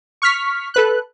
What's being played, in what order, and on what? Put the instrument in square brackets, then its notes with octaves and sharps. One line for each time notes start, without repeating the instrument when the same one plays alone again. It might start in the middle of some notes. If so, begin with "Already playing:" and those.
[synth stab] C#6 F6 B6
A4 B4 F#6